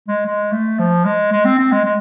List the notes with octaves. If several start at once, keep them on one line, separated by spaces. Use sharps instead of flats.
G#3
G#3
A3
F3
G#3
G#3
C4
C4
G#3
G#3